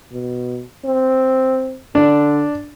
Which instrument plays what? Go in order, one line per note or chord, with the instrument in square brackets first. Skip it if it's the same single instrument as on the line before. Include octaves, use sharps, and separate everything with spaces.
[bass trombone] B2
C4
[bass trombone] D3 [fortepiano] D4